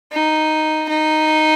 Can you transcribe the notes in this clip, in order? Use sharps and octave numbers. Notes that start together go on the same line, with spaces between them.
D#4
D#4